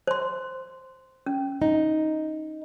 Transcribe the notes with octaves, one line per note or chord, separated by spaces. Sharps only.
C5 C6
C#4
D#4